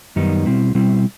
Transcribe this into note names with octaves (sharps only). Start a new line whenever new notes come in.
F#2 D#3 G3 B3 D#4
B2 G3 C4 E4
B2 G3 C4 E4